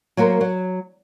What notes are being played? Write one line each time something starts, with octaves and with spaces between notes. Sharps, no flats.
F#3 A#3 F#4 A#4 C5
F#3